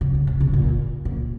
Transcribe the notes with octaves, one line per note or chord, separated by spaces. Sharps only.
C#3
C3
C#3
C3
A#2
A#2